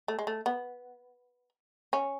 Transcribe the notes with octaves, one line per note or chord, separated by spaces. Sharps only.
A3
G#3
A3
B3
C#4